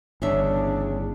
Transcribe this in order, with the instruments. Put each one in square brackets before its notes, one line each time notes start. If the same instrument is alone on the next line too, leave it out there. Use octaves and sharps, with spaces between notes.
[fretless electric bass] G1 [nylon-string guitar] E2 C#3 E5 [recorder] D4